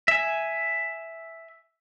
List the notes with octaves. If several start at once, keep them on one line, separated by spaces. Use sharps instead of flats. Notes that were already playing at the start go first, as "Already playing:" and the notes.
E5 G#5